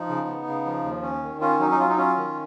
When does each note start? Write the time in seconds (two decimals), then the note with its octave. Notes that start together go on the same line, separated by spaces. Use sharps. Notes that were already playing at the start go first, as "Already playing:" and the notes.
Already playing: F3 D#4
0.09 C#3
0.27 B3
0.47 C#3
0.66 F3
0.84 D#2
1.03 C#4
1.23 D#3
1.41 C#4 F4
1.60 F#3 D#4
1.71 D#4
1.79 F#3 F4
1.89 D#4
1.98 C#4 F4
2.17 D#3